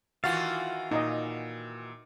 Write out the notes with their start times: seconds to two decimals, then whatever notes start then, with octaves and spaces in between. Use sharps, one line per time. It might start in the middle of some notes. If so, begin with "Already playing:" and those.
0.24 D#3 E3 F4 F#4 F5 A6
0.91 A#2 D#4 D#5